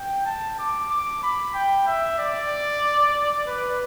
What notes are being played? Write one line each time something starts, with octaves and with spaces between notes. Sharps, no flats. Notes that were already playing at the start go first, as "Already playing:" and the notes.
Already playing: G5
A5
D6
D6
B5
G5
E5
D5
B4